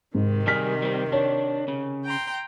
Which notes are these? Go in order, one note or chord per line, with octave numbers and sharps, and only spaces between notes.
G#2 C3 D#3
G3 G#4 F6 B6
G3 C4
D4 C#5
C#3
G5 A#5 C6